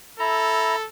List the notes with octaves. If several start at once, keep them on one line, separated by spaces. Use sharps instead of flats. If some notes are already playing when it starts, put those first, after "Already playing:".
E4 A4 A#5